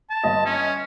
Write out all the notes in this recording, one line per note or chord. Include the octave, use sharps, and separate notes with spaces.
A5
G1 D#5
C#4